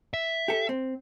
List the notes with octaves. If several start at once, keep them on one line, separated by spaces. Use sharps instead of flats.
E5
G4 A4
C4